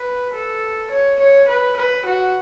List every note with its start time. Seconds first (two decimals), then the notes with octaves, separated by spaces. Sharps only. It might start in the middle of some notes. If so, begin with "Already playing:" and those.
Already playing: B4
0.34 A4
0.91 C#5
1.19 C#5
1.48 B4
1.77 B4
2.05 F#4